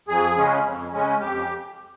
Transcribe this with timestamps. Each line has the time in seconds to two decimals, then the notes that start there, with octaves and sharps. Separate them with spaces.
0.08 F2 G#4
0.37 C#3 G#3 C#4
0.65 F2
0.92 C#3 G#3 C#4
1.20 F2 G4